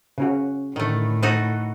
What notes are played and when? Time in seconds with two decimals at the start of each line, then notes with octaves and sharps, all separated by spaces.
0.18 C#3 C#4 F#4
0.76 A2 D3 D#3 A3
1.23 A3 D#4 F#4